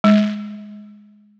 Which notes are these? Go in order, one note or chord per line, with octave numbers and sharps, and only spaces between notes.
G#3